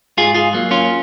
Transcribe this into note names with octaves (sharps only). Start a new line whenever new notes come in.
G#2 F4 G#4
F4 G#4
F#3 A#3
C#4 F4